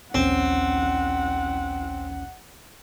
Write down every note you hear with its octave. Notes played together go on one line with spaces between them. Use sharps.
A#1 D#2 C4 C#4 F#5